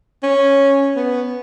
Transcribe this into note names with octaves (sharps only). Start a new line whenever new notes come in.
C#4
B3